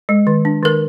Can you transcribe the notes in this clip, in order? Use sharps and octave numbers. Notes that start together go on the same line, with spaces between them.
G#3
D#3
D4
D#3 A#4